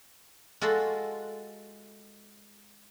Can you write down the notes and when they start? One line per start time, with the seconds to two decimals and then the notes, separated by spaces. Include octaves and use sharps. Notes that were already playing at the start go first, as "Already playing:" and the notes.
0.61 G#3 F4 F#4 A4 D#5